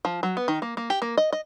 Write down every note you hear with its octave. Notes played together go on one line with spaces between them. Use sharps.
F3
F#3
B3
D#3
A#3
A#3
G4
A#3
D#5
D#5